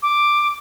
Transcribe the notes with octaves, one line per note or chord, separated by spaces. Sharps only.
D6